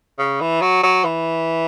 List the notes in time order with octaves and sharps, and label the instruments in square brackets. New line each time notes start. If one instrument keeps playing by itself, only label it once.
[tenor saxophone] C#3
E3
F#3
F#3
E3